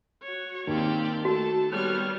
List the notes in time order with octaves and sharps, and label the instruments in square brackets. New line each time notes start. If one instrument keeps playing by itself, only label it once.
[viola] F#4 C#5
[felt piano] D#2 [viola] A#3 C4 [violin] G4 D5
[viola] A3 [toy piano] F#4 [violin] A4 A5
[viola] G3 B3 [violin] C#5 F6